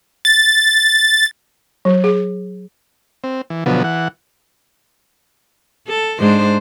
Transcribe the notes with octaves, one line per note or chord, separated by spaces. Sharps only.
A6
F#3
G#4
C4
E3
B2 D3 F3 F#3 B3
E3 F#5
A4
G#2 D4 C5